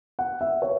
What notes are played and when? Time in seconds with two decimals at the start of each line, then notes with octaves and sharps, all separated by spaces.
0.19 F#5
0.41 E5
0.62 C#5